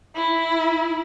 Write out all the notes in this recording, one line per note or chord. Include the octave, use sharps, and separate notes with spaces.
E4